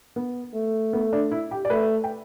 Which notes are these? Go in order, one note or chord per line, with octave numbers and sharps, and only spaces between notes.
B3
A3
B3
D4
E4
G4
D5
A3 B4
G5